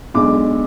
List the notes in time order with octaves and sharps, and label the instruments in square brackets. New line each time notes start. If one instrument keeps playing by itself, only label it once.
[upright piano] B1 B2 G#3 D4 D6